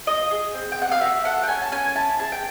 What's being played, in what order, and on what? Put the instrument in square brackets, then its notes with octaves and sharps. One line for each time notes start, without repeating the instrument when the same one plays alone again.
[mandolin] F4 D#5
G#4
C4
G5
C4 F#5
F5
F#4 E5
A4 F#5
G5
C#4 G#5
A5
C#4 G#5
E4 A5
G#4 A5
G5